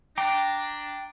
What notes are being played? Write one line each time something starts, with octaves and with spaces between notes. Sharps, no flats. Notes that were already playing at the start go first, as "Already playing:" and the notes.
D4 G5 A#5 D6